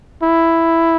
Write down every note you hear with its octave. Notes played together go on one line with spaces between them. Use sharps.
E4